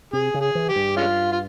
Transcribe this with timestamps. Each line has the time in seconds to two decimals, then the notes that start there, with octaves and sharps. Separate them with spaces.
0.13 C3 G#4
0.34 C#3
0.41 G#4
0.55 E3
0.69 G4
0.76 G2
0.97 G#3 C#4 F4
1.32 F4